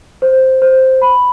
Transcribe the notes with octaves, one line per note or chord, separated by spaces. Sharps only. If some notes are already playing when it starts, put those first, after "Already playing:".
C5
C5
B5